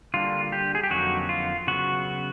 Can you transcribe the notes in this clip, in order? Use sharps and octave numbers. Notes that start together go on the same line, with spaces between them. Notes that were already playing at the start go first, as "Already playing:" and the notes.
D3 G3 A#3 D4 F4
G4
G#4
G4
F2 D3 F#3 A#3 D#4 F#4
F4
C#3 F#3 B3 F#4